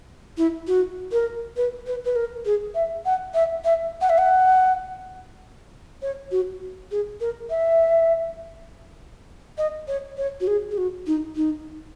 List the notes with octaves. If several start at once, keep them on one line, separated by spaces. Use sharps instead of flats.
E4
F#4
A#4
B4
B4
B4
A#4
G#4
E5
F#5
E5
E5
F#5
E5
F#5
C#5
F#4
G#4
A#4
E5
D#5
C#5
C#5
F#4
G#4
G#4
F#4
D#4
D#4